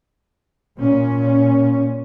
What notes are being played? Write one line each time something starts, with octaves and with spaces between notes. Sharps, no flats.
A#2 C#4